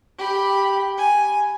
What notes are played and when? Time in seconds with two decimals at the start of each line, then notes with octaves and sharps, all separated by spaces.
0.18 G4 B5
0.98 G#5